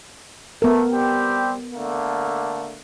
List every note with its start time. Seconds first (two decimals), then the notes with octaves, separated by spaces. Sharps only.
0.62 A3 B3 A#4
0.92 G3 C4 G4
1.73 D3 A3 A#3